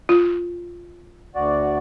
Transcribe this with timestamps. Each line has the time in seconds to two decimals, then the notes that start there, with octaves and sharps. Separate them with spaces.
0.09 F4
1.35 D2 F#4 D5